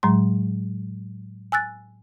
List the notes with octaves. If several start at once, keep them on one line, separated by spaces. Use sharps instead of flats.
A2 F#3 G#3 C6
G#5 E6 F#6 A6